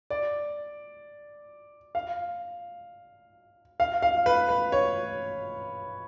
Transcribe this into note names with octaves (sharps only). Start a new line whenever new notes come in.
D5
F5
F5
F5
B4
B4
C#5